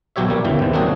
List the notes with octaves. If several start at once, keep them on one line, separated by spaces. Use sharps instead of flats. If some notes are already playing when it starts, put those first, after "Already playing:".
B1 B2 F#3 G4 C#5 E5
G3 A#3
G1 E2 C#3 E3 G5
D#2 C3
F#3 A#3 C4 D4 F#4 G#4